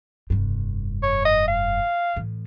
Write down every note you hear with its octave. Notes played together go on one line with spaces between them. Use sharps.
F1 G2
C#5
D#5
F5
A2 E3